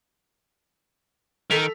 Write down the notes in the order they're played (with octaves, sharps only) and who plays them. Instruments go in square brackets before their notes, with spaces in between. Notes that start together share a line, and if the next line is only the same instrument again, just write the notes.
[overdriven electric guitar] D#3 [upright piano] A4 B6 F7